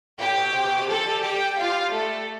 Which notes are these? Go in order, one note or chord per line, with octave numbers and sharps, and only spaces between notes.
A2 G4 G5
B2
C3
B2
C3
F3 A4 A5
G3
G3 G4 G5
F4 F5
A3 A4